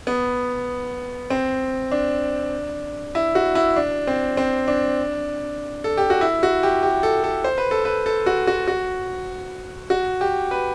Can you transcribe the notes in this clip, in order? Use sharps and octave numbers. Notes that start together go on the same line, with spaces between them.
B3
C4
D4
E4
F#4
E4
D4
C4
C4
D4
A4
G4
F#4
E4
F#4
G4
G4
A4
A4
C5
B4
A4
B4
A4
F#4
F#4
F#4
F#4
G4
B4